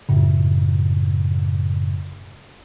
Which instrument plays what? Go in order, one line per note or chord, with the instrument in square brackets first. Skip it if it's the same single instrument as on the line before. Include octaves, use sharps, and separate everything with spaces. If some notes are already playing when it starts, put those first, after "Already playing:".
[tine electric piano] F#2 A2 C#3